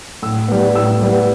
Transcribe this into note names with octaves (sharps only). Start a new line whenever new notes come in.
A2 E6
G3 B3
A2 E6
G3 B3